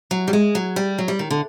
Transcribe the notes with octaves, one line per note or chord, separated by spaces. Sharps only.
F#3
G3
G#3
F#3
G3
F#3
G3
D#3
D3